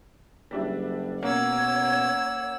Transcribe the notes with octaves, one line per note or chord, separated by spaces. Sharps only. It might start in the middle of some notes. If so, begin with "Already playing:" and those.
F#1 G3 D4 E4
B2 A#3 C#4 C#5 F#5 E6